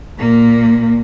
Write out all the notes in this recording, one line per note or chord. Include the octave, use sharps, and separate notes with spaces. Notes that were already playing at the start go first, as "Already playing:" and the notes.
A#2 A#3